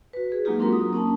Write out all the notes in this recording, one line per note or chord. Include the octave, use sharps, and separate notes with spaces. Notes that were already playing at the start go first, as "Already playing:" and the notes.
F#4 B4
G#4
F#3 G#3 A#3 D#4 F4 G4
F#3 C4 D4 F#4 A#4 A#5
D#6
A#3 C#4 D4 A5